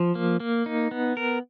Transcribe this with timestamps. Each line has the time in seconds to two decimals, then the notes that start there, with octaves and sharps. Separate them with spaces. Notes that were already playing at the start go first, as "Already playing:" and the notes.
Already playing: F3
0.15 A#3
0.40 A#3
0.66 D#4
0.91 B3
1.17 A#4